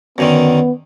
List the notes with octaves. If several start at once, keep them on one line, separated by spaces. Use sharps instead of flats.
F#2 D3 D#3 B3